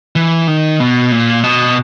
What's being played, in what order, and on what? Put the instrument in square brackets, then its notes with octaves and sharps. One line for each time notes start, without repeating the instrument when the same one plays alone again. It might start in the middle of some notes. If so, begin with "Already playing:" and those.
[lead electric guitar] E3
D#3
B2
A#2
B2